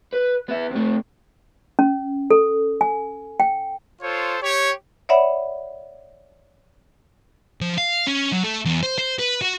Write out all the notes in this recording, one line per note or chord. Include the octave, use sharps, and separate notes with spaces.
B4
B3 E5
C3 A3
C#4
A4
G#5
G5
F4 A4 C5 C#5
G4 C#5
C#5 D5 E5 F#5 B5
F3
F5
C#4
F#3
A3
E2
C5
C5
B4
F#4